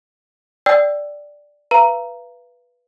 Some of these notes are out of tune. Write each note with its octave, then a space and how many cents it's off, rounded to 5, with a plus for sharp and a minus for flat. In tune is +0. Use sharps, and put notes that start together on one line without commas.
D5 +0 G5 +0 E6 +15
B4 -5 F5 -40 A#5 +0